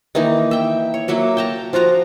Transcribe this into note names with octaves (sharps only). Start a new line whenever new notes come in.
D#3 E3 A#3 D#4
E5 G5
C#5
F#3 A#3 E5 F#5
G5 A5 A#5
F3 F4 F#4 A#5